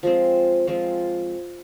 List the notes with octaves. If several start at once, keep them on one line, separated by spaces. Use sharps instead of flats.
F3 G#3 C4
F3 G#3 C4